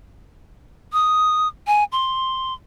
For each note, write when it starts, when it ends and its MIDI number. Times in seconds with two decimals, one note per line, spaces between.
0.93 1.48 87
1.67 1.84 80
1.92 2.53 84